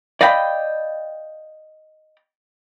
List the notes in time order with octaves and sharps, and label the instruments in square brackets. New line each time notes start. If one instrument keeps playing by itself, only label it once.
[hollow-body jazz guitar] D5 D#5 F5 G5 A5 B5